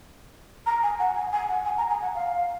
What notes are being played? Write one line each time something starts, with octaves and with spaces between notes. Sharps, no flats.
A#5
G#5
F#5
G#5
G#5
F#5
G#5
A#5
G#5
F#5
F5